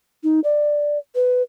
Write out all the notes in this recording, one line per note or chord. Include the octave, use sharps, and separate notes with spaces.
D#4
D5
B4